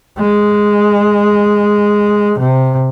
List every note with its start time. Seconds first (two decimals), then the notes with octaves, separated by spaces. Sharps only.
0.18 G#3
2.39 C3